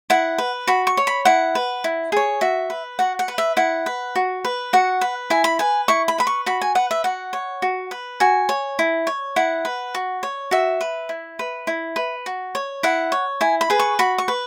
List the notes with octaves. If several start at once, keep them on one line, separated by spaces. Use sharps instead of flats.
E4 F#5
B4
F#4 B5
C#6
C#5
B5
E4 F#5
B4
E4
G#4 C#5
F#4 E5
B4
F#4 F#5
F#5
B4
E5
E4 F#5
B4
F#4
B4
F#4 F#5
B4
E4 G#5
B5
B4 G#5
E4 C#6
B5
B4 B5
C#6
F#4 B5
G#5
B4 F#5
E5
F#4 F#5
C#5
F#4
B4
F#4 G#5
C#5
E4
C#5
E4 F#5
B4
F#4
C#5
F#4 E5
B4
E4
B4
E4
B4
F#4
C#5
E4 F#5
C#5
E4 G#5
B5
G#4 B4
C#6
F#4 B5
C#6
B4